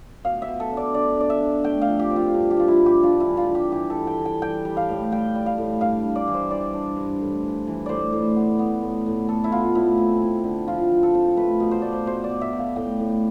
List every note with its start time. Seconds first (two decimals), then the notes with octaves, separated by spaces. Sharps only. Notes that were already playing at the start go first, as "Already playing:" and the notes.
0.25 B2 F5
0.42 E5
0.48 B2
0.60 A4
0.72 D4
0.77 D5
0.94 D4 D5
1.18 D4 D5
1.30 E5
1.40 D4
1.64 A3 G5
1.81 F5
1.88 F3
1.99 G4
2.10 C4
2.16 F4
2.34 G2
2.51 G4
2.57 F3 F4
2.68 E4
2.81 G2
2.86 G4
3.03 D4 F4
3.20 E4
3.26 E3
3.37 F4
3.49 E3
3.55 G4
3.72 E3 G4
3.90 A4
3.96 E3
4.07 G5
4.19 E3
4.25 G5
4.42 G3 G5
4.65 G3
4.77 F5
4.89 A2
5.12 G3 G5
5.35 G3
5.46 F5
5.58 A2
5.81 G2 F5
6.05 G2
6.16 D5
6.27 E3
6.34 C5
6.50 E3 D5
6.74 D4
6.97 G2
7.21 A2
7.44 E3
7.67 E3
7.86 A2 C5 D5
8.12 A2
8.36 B3
8.59 B3
8.83 A2
9.06 A2
9.28 B3 A4
9.44 E4
9.51 B3 F4
9.75 A2 E4
9.98 C4
10.22 E4
10.44 D3
10.68 F3 F4
10.91 F3
11.03 A4
11.15 C4
11.37 A3 B4
11.60 B2
11.71 C5
11.82 A3 D5
11.93 C5
12.06 B2 C5
12.24 D5
12.30 B2
12.41 E5
12.53 B2
12.59 F5
12.76 A2 G5
13.00 A2